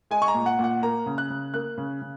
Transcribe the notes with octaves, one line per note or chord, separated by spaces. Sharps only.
G#3 G#5
C#6
A#5
A#2
F#5
A#2 F#5
A#3 A#5
C#3
F#6
C#3
A#3 F#6
C#3
C#3